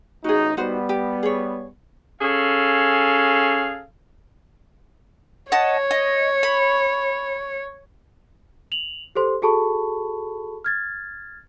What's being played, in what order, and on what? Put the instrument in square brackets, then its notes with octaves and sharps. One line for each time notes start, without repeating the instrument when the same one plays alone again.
[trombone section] A1 D#4 [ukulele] F#4 G#4
[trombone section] G3 B3 [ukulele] D#4 F#4 C5
[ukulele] G4
G#4 C#5
[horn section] C#4 G#4 A4 F5
[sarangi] C#5 [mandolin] D#5 F#5 A5
[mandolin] D#5
B5
[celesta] F7 F#7
G4 A4 C5 C6
F#4 G#4 A4 A5 B5 C#6
F6 G#6 A6